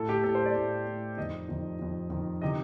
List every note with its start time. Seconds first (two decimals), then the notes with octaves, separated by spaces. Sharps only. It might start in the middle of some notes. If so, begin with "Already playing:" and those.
Already playing: A2 A4
0.09 G4
0.24 A2 A4
0.35 C5
0.46 D5
0.55 A2
0.86 A2
1.17 F2 D#3 D#5
1.49 F2 D#3
1.79 F2 D#3
2.10 F2 D#3
2.42 C3 D#3 D#5